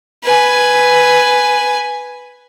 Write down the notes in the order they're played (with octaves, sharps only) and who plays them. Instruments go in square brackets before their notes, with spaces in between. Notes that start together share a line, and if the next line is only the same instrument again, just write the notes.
[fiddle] B4 G#5